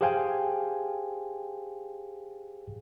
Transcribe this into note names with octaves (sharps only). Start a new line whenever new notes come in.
G4 G#4 C5 F5 G5 G#5